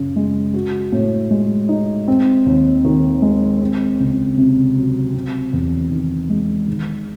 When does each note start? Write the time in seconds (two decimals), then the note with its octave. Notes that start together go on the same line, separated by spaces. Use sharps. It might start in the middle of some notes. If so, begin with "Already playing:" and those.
Already playing: F#2 C#3
0.16 G#3
0.54 F#4
0.92 A2
1.31 G#3
1.69 D#4
2.08 C4
2.46 D#2
2.85 D#3
3.22 G#3
3.61 C4
4.00 C#2
4.37 C3
4.76 F#3
5.14 C4
5.53 E2
5.90 D#3
6.30 G#3
6.67 D#3